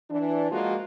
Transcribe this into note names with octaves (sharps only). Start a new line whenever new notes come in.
E3 D4
F3 G#3 A#3 F4 F#4